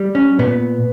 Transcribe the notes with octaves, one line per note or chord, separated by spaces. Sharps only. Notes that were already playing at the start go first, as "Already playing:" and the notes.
Already playing: G3
C#4
A#2 B3